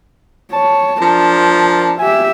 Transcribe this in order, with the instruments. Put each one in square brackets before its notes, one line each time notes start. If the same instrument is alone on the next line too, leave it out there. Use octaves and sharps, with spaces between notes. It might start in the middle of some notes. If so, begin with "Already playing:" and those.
[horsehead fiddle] C#5 [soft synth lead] A5
[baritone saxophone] F3 [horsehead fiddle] D4 A#4
[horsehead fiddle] G4 E5 [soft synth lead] G#5